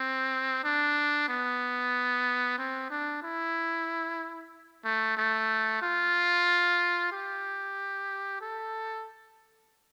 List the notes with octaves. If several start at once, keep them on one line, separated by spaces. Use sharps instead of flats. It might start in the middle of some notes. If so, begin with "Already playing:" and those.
Already playing: C4
D4
B3
C4
D4
E4
A3
A3
F4
G4
A4